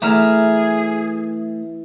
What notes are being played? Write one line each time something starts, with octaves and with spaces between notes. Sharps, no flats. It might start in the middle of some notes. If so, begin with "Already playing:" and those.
E3 A3 G#4 E5 A#5 D6 F6